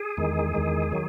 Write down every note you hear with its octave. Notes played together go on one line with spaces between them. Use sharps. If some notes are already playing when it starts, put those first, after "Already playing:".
Already playing: G#4
E2 D#3 G#3
E2 D#3 G#3
D#3 F#3